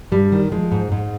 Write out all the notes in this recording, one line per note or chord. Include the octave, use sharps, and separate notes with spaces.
G2 G3
D#3
F3 G#3
G#2
G#2